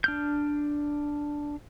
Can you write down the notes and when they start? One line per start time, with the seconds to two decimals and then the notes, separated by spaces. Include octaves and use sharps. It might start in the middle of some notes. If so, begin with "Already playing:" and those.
0.04 D4 F6 G6